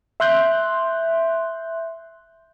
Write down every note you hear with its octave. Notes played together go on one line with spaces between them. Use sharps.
E5 C6 F#6 G6